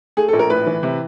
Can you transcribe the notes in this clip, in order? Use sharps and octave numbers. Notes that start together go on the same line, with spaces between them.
A3 G#4
A4
A#1
A#4
A2 B4
E3
C3